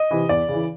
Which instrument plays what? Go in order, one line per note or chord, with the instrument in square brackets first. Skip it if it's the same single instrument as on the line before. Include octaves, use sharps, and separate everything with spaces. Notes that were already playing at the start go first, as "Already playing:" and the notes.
Already playing: [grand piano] D#5
C3 E3
E2 D5
C#3 E3